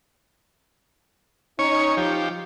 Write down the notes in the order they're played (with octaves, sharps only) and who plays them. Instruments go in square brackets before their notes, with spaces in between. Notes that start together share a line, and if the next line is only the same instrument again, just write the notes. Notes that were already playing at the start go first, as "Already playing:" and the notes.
[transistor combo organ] C#4 C#5 [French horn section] D#4
[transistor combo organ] F3 G4